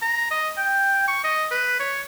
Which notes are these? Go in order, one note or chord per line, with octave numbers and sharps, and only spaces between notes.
A#5
D#5
G5
C#6
D#5
B4
C#5